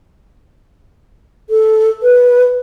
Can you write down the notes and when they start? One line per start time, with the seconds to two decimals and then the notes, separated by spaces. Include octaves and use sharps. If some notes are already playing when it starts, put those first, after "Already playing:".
1.50 A4
2.03 B4